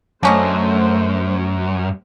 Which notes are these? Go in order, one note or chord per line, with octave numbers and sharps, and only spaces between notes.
F#2 D3 A3 C#4 C5 D#5